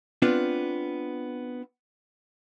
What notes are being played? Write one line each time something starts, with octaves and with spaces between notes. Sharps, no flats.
B3 C4 D4 F4